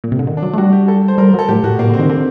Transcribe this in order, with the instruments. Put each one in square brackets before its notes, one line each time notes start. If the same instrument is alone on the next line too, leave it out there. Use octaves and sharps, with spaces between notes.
[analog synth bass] A#2
C3
D3
D#3
[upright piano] D4
[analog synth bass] F#3
A3
[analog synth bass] G3 [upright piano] F#4
[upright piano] G4
A4
C5
[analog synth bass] G3 [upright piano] A#4
[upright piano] A#4
[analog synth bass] F#3 [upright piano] A4
[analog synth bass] A2 [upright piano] G4
[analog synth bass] A2 [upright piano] F#4
[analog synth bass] A#2 [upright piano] A#3
[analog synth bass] D3 [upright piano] C4
[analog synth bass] D#3
[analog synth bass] D3 [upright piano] C4